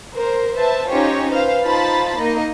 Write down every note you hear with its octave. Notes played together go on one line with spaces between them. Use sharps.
A#4 C5
B4 C5 E5 A5
C#4 D#4 F4 G4 C5 C#5
B4 C5 F5
D#4 F4 C5 A5 B5 A6
A#3 D#4 D#5